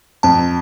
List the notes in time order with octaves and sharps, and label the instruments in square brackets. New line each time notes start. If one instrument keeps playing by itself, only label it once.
[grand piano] F2 [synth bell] A5